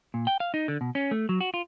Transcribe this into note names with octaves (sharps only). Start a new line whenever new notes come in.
A#2
G5
F5
D#4
D3
B2
C#4
A3
F#3
F#4
F4